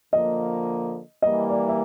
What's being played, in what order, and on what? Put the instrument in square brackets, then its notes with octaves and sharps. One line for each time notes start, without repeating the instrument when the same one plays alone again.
[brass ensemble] D3 F3 A#3 [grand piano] D#5
[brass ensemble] E3 G3 A#3 [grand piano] D#5
[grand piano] D5
E5